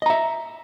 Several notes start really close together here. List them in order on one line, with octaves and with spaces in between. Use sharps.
D#5 A#5 E5